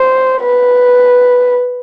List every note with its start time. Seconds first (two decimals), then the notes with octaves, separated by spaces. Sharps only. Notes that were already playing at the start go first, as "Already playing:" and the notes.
Already playing: C5
0.42 B4